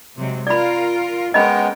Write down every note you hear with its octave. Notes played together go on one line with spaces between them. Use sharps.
C3 F#3 G#3
F4 A#4 D5 B5
G#3 B3 C#4 A#4 D#5 G5 B5